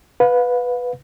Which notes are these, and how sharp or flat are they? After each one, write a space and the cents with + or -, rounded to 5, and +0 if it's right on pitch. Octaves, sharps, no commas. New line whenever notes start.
B4 +0 F5 +40